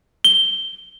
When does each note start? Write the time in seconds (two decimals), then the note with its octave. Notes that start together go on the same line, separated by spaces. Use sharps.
0.24 G7